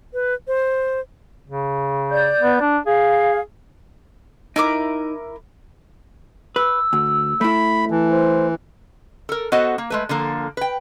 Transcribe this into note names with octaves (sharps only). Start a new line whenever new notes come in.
B4
C5
C#3
D5 G6
B3
D4
G#4 F5
D#4 E4 A#4 D6
B4 E6
D2
A3 E4 B5
E3 A5
C5
A4 A#4
B3 F#4 A4 C5 D#5 F#5
A#3
G#3 A3 B4
D3 F3 A#3 A4
B4 G5